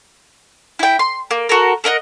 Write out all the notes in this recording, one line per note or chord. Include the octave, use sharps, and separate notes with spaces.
E4 G5
C6
A#3
F#4 A4 A#4
A4 A#4 D#5 F#5